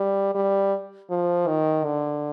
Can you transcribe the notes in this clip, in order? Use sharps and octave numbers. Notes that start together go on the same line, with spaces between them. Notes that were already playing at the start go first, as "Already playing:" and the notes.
Already playing: G3
G3
F3
D#3
D3